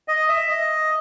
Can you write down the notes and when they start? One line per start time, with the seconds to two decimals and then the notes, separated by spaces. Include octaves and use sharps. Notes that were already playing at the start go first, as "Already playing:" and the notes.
0.08 D#5
0.29 E5
0.48 D#5